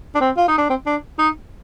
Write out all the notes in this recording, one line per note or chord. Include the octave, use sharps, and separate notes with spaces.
D4
C4
F4
D#4
D4
C4
D4
D#4